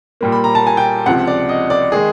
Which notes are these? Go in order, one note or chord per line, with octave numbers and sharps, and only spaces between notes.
A#2 G3 A#3
B5
A#5
A5
G#5
G5
C#2 C3 F3 F#5
D5
D#5
D5
D#3 G#3 G#4